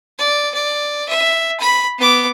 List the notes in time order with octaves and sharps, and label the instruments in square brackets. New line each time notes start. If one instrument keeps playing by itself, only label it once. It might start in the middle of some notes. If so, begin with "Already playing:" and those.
[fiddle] D5
D5
E5
B5
B3 D6